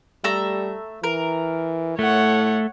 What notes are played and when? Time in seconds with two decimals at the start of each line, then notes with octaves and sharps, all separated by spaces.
0.24 G3 A3 E5 A#5
1.04 E3 A#4
1.99 A2 A3 C#5 F#5